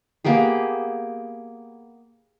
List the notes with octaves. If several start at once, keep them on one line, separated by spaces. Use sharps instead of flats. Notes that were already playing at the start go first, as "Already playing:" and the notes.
A#3 B3 G4 G#4